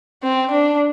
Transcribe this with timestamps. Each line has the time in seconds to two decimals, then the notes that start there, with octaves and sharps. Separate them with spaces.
0.23 C4
0.51 D4